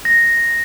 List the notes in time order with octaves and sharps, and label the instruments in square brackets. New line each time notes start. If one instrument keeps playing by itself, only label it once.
[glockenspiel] A#6